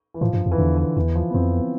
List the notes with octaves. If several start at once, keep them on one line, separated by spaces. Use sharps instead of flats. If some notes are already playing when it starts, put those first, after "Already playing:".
E3
A2 F3
G2
F2
E3
E2 D3
E3
E2 E3
F3
B3
F2 C4
B3